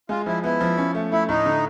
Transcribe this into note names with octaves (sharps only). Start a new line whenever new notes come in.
G#3 F4
F3 E4
B3 E4
F3
C#4
A3
A3 E4
A2 D#4
D3